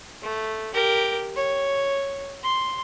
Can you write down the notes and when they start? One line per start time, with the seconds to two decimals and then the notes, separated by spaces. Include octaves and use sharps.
0.22 A3
0.74 G4 A#4
1.36 C#5
2.43 C6